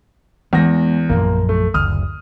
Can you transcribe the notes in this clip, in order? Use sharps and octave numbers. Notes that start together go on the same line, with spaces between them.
E2 G#3 A#3 B3 A#6
A#1 F#2 F3 A#3
A3
F#1 D2 D#6 F6